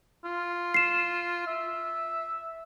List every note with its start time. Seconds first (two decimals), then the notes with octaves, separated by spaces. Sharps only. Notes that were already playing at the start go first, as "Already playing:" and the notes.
0.24 F4
0.74 C7 E7
1.47 E5